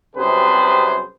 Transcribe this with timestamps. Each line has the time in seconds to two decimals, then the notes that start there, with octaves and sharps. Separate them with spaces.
0.16 C2 F#2 C3 G#4 B4 C5